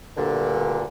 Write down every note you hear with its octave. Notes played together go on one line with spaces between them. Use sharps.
D2 G2 A#2 D3